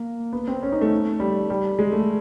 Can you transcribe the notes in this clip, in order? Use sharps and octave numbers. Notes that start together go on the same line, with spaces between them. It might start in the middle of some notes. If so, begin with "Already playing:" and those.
Already playing: A#3
B3
C4
C#4
D#4
A3
G3
G3
G#3
A3